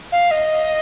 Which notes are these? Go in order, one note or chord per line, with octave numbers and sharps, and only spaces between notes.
F5
D#5